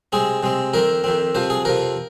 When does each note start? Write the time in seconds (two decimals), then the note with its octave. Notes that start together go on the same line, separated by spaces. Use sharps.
0.12 C3 G#3 C4 G#4
0.43 C3 G#3 C4
0.74 F2 D#3 C4 A#4
1.04 F2 D#3 C4
1.35 F2 C3 F3 C5
1.50 G#4
1.65 F2 C3 F3 A#4